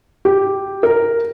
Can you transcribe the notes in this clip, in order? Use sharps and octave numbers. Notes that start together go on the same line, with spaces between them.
G4
A#4